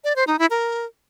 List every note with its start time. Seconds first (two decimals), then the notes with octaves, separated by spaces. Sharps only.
0.04 D5
0.16 C5
0.27 D#4
0.39 E4
0.50 A#4